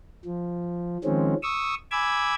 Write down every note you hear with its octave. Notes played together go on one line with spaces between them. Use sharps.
F3
D#3 F3 G#3 C4 C#4
C#6 D#6 E6
G#5 B5 D6 E6 G#6